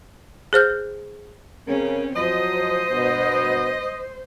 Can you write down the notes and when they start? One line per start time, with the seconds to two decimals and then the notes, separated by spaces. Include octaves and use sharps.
0.53 G#4 C5 F6 G6
1.68 C#3 C4 C#4 A#4
2.16 F3 F#3 C5 D#5
2.90 G2 B2